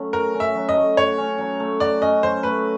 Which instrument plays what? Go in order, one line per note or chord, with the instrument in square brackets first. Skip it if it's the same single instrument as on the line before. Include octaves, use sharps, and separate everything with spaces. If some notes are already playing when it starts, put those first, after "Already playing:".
Already playing: [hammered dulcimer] F#3 A3 C#4
[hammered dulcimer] F#4 [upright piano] A#4
[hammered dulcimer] C#4
[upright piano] E5
[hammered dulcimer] F#3
[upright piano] D#5
[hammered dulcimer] A3
[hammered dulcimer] F#4 [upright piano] C#5
[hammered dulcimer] C#4
F#3
A3
[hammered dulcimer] F#4 [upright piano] D5
[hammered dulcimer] C#4 [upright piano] D#5
[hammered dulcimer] F#3 [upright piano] C5
[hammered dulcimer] A3 [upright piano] B4